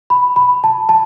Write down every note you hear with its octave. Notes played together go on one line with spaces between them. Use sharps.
B5
B5
A5
A5